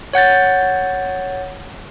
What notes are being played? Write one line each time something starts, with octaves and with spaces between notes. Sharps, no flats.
C#5 F#5 G6 A6